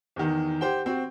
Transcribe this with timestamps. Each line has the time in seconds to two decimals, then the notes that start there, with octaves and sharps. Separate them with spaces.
0.16 E2 D#3
0.61 G4 C5 F#5 G5
0.86 C4 F#4